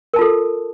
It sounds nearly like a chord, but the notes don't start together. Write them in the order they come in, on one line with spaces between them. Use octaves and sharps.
A#4 A5 F4 A4